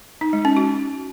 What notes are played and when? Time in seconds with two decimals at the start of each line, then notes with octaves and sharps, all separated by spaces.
0.21 D#4
0.33 G#3
0.45 C#4
0.57 F#4